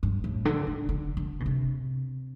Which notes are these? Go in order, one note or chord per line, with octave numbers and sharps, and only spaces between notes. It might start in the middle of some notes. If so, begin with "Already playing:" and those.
G2
A2
D3
D3
D3
D3
B2
C3